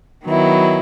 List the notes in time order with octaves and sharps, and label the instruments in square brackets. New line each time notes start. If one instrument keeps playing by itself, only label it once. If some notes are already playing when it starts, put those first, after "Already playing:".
[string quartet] D#3 F#3 B3 E4